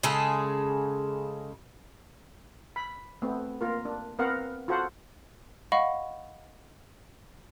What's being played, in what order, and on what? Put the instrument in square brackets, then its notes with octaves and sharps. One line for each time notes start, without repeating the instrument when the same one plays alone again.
[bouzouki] C#3 G#3 G#4 A4
[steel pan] B5
A3 B3 C4
A#3 F4 A#4
D4
B3 C4 A#4 F5 F#5
F4 F#4 A4 C5 F#5
[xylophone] D#5 F5 F#5 B5 C#6